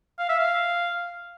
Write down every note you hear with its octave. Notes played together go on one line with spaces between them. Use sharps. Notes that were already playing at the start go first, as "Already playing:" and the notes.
F5
E5
F5